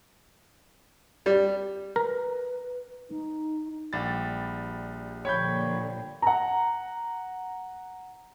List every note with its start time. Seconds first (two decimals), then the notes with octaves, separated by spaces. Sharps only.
1.26 G3
1.96 A#4 B4
3.10 D#4
3.93 A#1 G3 G4 F#5 A6
5.25 A#2 D3 F3 C#5 G5 B5 G6
6.22 F#5 A#5